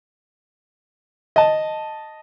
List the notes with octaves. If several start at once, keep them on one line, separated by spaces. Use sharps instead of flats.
D#5 A5